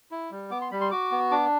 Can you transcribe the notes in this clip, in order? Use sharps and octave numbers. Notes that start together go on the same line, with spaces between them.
E4
G3
B3 D6
C6
G3 B5
C6
F#4 D6
B3
D4 D6